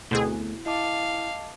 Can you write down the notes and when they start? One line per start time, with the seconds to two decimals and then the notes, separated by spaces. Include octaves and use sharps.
0.11 D2 B2 A3 C4 E4 G#4
0.66 E4 D#5 F5 A5 D6